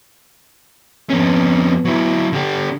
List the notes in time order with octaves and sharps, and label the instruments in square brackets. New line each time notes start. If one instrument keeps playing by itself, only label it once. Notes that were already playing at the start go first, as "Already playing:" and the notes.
[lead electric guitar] F2 C#4 [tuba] B3
[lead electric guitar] F#3 E4
D3 G4